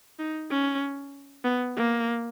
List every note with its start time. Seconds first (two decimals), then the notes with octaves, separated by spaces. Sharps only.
0.19 D#4
0.51 C#4
1.45 B3
1.77 A#3